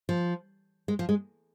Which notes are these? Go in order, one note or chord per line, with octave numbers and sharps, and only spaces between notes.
F3
G#3
F3
G#3